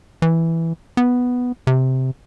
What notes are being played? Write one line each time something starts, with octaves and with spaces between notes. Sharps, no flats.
E3
B3
C3